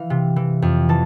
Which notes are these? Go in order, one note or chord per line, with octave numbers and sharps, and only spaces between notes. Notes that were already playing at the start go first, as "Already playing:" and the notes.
Already playing: E3 F5
C3
E3
F2
E3 A5